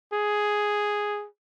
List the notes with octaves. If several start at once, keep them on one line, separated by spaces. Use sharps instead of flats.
G#4